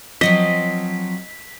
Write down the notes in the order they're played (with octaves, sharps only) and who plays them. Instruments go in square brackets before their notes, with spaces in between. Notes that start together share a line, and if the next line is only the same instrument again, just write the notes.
[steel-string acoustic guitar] F3 F#3 C4 [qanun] D#5 [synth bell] B6